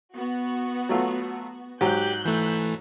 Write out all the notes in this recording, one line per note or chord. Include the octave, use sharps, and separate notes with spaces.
B3 F#4
F#3 A3 F4
G#2 F#3 G4 F#6 G6
E3 A3